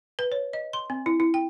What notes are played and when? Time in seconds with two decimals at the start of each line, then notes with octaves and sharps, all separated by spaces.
0.19 B4
0.32 C#5
0.53 D#5
0.73 C6
0.90 C4
1.06 E4
1.20 E4
1.34 G5